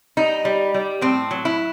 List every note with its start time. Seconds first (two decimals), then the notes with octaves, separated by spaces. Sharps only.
0.17 G3 D#4
0.45 G3
0.74 G3
1.01 A2 C4
1.31 F#3
1.45 E4